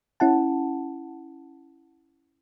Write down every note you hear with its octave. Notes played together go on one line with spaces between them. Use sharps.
C#4 E4 F#5 A5